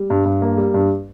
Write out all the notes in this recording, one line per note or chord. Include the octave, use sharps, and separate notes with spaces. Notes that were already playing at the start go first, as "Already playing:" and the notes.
Already playing: G3
G2
G2
A#3
G3
G2